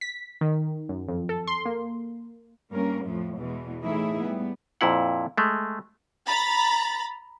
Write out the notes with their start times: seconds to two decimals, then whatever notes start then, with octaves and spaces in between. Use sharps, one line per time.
0.01 B6
0.41 D#3
0.89 F#2
1.09 F2
1.29 A4
1.47 C6
1.65 A#3
2.72 G2 A#3 C#4 A#4
3.04 F2 A2 F3 A3
3.36 E2 B2 E3 G#3
3.82 A2 E3 A3 D#4 E4 G#4
4.22 G3 B3
4.81 F2 A#2 E4 F#5
5.37 G#3 A3
6.26 A#5 B5 A6